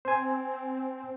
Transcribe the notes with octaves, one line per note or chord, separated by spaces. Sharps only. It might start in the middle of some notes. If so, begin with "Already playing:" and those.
C4 C5 G#5